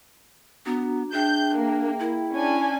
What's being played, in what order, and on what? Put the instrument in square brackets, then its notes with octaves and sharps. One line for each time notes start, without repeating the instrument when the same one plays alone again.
[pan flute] B3 [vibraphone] D4 F#4 A#5
[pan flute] D4 [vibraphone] G#4 E5 G5 [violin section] G6
[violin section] A#3
[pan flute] E4
[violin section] C#4 D4 G#5